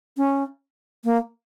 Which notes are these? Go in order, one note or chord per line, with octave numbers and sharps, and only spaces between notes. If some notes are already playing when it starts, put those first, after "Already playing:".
C#4
A#3